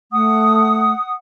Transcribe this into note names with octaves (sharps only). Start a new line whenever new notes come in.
A3 F#5 D#6